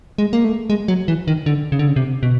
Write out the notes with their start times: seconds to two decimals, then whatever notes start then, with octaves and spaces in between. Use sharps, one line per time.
0.18 G#3
0.33 A#3
0.45 A3
0.70 G#3
0.88 F#3
1.08 E3
1.28 D#3
1.46 D3
1.72 C#3
1.79 D3
1.88 C#3
1.96 C3
2.23 B2